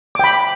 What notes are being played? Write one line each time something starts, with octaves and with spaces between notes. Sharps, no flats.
G5 B5 D6